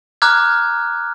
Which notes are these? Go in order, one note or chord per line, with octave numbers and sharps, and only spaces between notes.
A#5 D6 F6 F#6 G#6